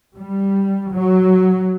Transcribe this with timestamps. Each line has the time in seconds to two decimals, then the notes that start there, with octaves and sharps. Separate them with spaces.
0.17 G3
0.94 F#3